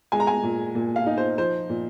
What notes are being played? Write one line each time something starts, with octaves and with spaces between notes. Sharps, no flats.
G#3 G#5
A#5
G#5
A#2
A#2
F5
D#4
C5
F3 C5
A#2